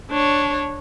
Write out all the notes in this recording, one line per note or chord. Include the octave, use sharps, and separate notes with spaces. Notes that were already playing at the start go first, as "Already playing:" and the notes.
D4 C#5